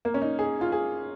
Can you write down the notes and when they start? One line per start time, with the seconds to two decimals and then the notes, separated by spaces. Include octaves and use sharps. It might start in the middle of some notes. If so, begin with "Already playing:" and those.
0.05 A#3
0.14 C#4
0.22 D#4
0.39 G#4
0.61 F4
0.72 G#4